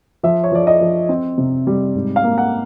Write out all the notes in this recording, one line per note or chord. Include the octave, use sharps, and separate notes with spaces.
F3 E5
C#5
F3 D5
D#5
F3
C4
C3
G3
G#2
F5
A#3
F#5